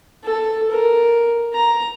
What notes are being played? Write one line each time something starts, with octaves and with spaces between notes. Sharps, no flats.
A4
A#4
A#5